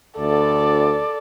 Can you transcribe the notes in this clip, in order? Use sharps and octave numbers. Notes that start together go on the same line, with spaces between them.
D2 A4 D5